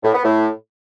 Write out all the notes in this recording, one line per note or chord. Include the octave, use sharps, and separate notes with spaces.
A2
B3
A2